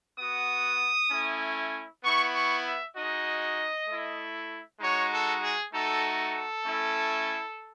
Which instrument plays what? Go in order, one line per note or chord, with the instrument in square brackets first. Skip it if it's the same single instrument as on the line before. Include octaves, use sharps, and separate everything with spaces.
[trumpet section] B3 F#4 D#6
A3 C#4 E4
B3 E4 C#6
C#6
E5
G#3 D#4 F#4 D#5
A3 E4
G#3 D#4 F#4 C#5
A4
G#4
A3 D#4 F#4 A4
A4
A3 C#4 E4